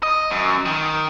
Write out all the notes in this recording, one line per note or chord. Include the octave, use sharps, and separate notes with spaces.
D#5
F#2
D#3